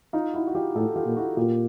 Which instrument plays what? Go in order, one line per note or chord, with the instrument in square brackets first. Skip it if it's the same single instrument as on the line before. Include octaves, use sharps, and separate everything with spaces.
[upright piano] D#4 F4
E4 F#4
F#4
F4 G4
[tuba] A2 [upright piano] G4 A4
[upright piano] F4 G4
[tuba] A#2
[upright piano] E4 F#4
[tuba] A#2 [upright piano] F4 G4